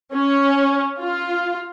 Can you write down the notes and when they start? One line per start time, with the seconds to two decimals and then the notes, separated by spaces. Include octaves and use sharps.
0.13 C#4
1.00 F4